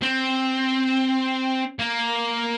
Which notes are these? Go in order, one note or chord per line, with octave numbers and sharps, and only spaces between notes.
C4
A#3